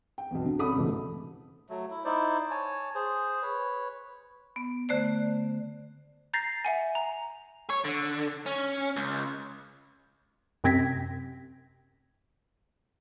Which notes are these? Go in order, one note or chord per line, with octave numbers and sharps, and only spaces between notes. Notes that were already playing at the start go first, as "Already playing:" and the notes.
G5
B1 E2
D3
C2 C#4 A4 B5 D#6
C#2 G#2 B2 E3 A3
F#3 A3
E4
D#4 E4 C5 D5
C#5 G#5 A5
G#4 C5
B4 C#5
B3
D3 A3 C5 D5
A#5 G6 A6 A#6 C7
E5 F#5 G#5
A#5
C#5
D3
C#4
C#2
F#2 C3 C4 G#6 A#6 B6